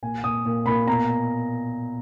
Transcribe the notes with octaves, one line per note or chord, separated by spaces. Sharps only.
A#2 G#5
A#2 D#6
A#2
A#2 B5
B2 A#5